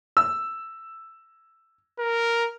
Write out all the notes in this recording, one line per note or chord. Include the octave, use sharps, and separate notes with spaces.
E6
A#4